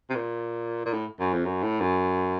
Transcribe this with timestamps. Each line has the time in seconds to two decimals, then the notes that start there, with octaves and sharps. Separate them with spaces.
0.10 C3
0.15 A#2
0.85 A#2
0.93 A2
1.19 F#2
1.34 F2
1.46 F#2
1.63 A2
1.81 F#2